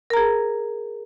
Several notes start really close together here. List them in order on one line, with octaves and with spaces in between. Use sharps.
A#4 A#5 G#4